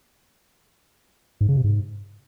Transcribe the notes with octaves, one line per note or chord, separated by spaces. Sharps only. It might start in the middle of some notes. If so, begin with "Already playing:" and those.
G#2
C#3
C3
G#2